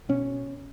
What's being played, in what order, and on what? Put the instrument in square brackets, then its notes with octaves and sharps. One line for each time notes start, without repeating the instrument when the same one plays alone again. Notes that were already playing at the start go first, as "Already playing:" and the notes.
[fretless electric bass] B2 C#4